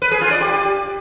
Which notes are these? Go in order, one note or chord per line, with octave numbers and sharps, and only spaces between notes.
B4
G#4
F4
D5
G4